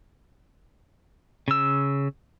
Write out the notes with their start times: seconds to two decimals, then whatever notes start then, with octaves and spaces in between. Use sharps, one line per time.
1.48 C#3 E6